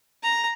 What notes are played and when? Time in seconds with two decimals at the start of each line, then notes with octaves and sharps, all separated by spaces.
0.23 A#5